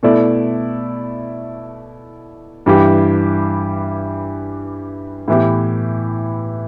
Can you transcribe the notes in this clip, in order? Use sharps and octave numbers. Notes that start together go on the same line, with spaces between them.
B2 A3 E4 A4 D5
G2 E3 G3 E4 G4
A2 E3 B3 E4 G4